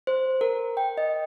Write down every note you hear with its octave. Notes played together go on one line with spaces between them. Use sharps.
C5
A#4
G5
D#5